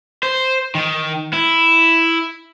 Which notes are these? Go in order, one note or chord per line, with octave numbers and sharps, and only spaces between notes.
C5
D#3
E4